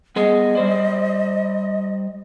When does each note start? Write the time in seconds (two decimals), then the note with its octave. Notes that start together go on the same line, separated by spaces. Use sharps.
0.16 G3 B3 G#4 D#5
0.55 G3 C5 D5